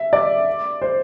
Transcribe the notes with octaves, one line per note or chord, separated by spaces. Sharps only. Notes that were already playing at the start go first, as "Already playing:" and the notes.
Already playing: E5
D5
C5